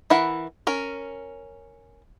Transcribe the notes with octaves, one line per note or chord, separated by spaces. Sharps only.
E3 E4 A#4 F#5
C#4 A#4